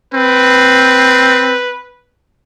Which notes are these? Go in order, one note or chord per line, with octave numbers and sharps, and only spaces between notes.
C4 B4